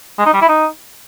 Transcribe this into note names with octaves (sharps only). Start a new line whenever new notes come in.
G#3
D#4
G3
E4
D#4